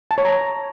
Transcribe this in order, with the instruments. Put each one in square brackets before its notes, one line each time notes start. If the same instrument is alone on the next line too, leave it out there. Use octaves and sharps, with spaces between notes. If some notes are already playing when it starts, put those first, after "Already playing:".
[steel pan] A5
C#5
A#5